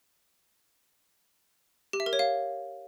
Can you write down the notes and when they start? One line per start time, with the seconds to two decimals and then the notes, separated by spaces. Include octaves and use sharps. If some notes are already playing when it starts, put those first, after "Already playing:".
1.93 G4
2.00 E5
2.06 A#4
2.13 C#5
2.19 F5